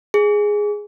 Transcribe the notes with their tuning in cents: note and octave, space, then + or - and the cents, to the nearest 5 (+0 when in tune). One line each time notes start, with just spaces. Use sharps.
G#4 +0